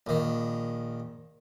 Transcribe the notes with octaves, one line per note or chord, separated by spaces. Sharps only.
A#1 D#3